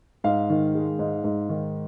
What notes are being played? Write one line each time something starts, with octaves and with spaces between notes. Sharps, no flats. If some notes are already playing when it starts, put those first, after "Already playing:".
G#2 F5
D#3
G#3
G#2
G#2
D#3